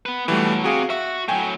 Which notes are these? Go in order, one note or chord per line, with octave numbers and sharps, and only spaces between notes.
B3 B4
B2 E3 F#3 G3 A3
C3 F#4 G#4 F5
F#4 E5
A2 F#3 G5 G#5